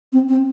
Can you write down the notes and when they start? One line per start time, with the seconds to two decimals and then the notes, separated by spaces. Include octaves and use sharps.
0.13 C4
0.29 C4